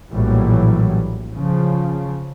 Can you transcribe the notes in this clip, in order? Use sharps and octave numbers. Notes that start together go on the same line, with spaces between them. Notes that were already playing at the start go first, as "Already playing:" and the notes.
A#1 A2 E3 F#3 G3
C#3 F3